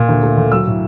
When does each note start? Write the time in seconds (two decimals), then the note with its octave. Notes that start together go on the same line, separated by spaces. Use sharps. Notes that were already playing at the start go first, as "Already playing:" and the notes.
Already playing: A#2
0.09 D2
0.23 A3
0.37 D2
0.52 F#3 E6
0.67 A2